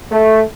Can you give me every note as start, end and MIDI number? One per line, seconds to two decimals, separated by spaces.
0.12 0.43 57